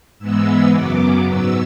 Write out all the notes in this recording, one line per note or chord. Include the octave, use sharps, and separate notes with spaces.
G#2 E3 G#3 B3 E6
F#2 C#3 F#3 B3 D6
G#2 F#3 B3 E6